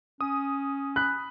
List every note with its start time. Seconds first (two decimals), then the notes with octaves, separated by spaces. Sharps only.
0.21 C#4 D#6
0.96 B5 F#6